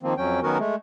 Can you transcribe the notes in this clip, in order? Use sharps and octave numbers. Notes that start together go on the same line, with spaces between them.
D#3 F3 A#3 C4
F2 F#3 C#4 G5
D#3 F#3 B3 C#4 F#4 A#4
G#3 A3